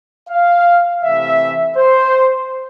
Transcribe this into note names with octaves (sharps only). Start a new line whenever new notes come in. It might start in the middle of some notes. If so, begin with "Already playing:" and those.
F5
C3 E3 A3 E5
C5